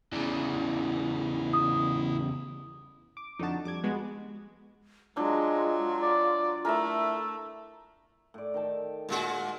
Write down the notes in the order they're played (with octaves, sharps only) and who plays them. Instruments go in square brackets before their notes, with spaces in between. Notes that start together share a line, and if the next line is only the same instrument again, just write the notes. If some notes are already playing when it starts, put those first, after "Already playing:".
[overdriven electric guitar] E2 C#3 [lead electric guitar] E4 D5
[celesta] D#6
[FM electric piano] D6
[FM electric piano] F2 D3 F#4 [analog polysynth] D#4 A5
[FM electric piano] F2 G3 G#6 [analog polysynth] D6
[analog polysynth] G#3 B3 F#4
[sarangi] F#3 [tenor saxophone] G#3 [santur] D4 [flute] F4
[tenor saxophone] D5
[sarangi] A3 [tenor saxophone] E4 [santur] A#4 E5
[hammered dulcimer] A2 D5
D#3 G5 A5
[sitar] A#2 G#3 F#4